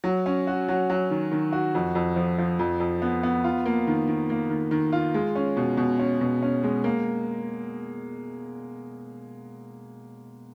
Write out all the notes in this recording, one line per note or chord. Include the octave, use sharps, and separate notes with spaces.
F#3
C#4
F#4
F#3
F#3
D#3
D#3
F#4
F2
F2
F3
F3
F2
F2
B3
B3
F4
A#3
D#3
D#3
A#3
D#3
D#3
F4
G#3
C#4
B2
B2
C#4
B2
C#4
G#3
A#3